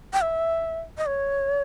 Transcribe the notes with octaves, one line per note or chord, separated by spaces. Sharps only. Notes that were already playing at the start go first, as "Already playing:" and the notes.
G5
E5
D#5
C#5